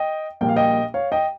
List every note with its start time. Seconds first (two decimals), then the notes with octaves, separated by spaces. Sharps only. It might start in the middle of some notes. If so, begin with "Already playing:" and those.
Already playing: D#5 G5
0.41 A#1 A#2 G3 A#3 G5
0.49 F5
0.56 D#5 G5
0.94 C#5 F5
1.12 D#5 G5